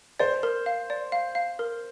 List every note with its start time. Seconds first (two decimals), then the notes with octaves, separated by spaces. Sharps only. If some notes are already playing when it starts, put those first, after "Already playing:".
0.19 C5 D5
0.43 A#4
0.66 F5
0.90 D5
1.12 F5
1.35 F5
1.59 A#4